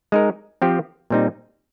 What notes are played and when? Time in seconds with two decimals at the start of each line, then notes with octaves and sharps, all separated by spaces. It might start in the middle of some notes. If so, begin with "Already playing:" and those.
0.12 G#3 D#4 A#4
0.62 F3 C4 G4
1.10 A#2 G3 C4 D#4